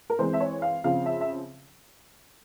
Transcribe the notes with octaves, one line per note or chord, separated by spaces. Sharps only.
A#4
E3 G#3 C4 C5
E5
C#5
F5
C#3 F3 C4 F5
E5
E5